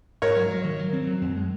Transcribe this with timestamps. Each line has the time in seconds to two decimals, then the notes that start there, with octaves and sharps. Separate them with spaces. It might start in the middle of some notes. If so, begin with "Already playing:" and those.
0.22 G#2 A#4 C#5
0.36 F#3
0.51 F#3
0.64 D#3
0.79 F#3
0.93 C4
1.07 F#3
1.22 F#2
1.36 G#3